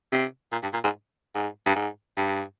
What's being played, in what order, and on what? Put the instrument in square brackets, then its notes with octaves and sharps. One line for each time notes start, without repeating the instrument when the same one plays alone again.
[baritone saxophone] C3
A#2
G2
A#2
G#2
G#2
G2
G#2
G2